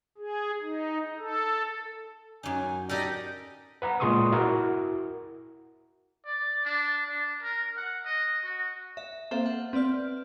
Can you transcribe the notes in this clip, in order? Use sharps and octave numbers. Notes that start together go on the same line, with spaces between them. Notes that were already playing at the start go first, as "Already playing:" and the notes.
G#4
D#4
A4
F#2 D#4 G#5
D#4 G4 A4 A#4 D5 D#5
B4 F#5 A#5
A#2 G#3 C6 C#6 D#6
E4 F#4 A#4
D5
D4
D4
A#4
F#5
D#5
F#4
E5
A#3 C4 A4 C5 E5 F5
F#5
C4 B4 D5 F6